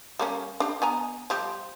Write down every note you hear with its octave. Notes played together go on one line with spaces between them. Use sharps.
G3 A#3 C#4
D4 G4
B3 G#5 A#5
F3 G3 G4